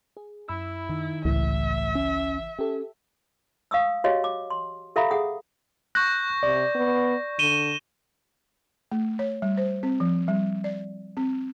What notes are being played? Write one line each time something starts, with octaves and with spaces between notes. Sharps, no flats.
G#4
F#2 E4 B5 E6
D#3
G#1 C#2 A2 C#3 E3 E5
C#4
C#4 G4 A4
F5 C#6 D#6 E6
F#4 G4 C#5 D#5 F5
D6
C6
G4 A4 E5 F5 A#5 B5
G#4 F#5 D#6
C#6 F#6 G6 A#6
C3 D5
B3
D3 D#7 E7 G7
A3
C#5
G3
C5
C4
F3
G3
D5
C4